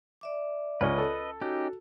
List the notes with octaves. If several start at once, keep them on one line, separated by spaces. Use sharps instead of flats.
D5 E5 D6
C#2 C#4 B4 D#5
A4
C#4 D#4 F#4 G4